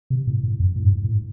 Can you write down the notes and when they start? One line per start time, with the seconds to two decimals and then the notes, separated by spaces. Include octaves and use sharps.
0.10 C3
0.27 A2
0.43 A2
0.60 F2
0.76 A2
0.83 G2
1.04 A2